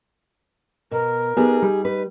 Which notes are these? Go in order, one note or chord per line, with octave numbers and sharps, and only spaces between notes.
B2 A#4
B3 D#4 G4 G#4
G3
D#4 B4